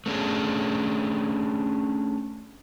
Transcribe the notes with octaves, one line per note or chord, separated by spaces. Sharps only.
A3 C#4 D4 G#4